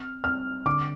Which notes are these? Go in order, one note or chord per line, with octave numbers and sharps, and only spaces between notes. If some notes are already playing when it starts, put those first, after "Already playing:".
Already playing: C4 F6
C4 F6
D3 D6